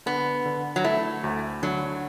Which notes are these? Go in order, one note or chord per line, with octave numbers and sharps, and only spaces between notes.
D3 B3
D3
F#3
A3 E4
D2
D3 F#3